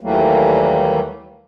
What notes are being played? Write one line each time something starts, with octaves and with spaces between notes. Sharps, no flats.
D#2 E3 F#3 G3 A3 A#3